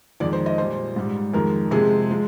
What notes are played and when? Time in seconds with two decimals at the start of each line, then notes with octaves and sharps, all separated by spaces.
0.20 F2 D#3 G#3 D5
0.33 C5
0.46 D#5
0.58 A#2 G3 C5
0.96 G#2 G3
1.34 F2 D#3 G#3 A#4
1.71 C3 F3 G#3 G#4
2.10 F3 G#3